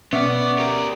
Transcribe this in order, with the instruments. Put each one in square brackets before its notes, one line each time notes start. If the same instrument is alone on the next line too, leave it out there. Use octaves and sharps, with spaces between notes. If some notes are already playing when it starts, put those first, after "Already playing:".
[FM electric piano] B2 E5 C#6 [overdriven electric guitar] B3 [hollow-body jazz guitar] C#4 F#5 [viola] D5
[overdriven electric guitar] G4 A#4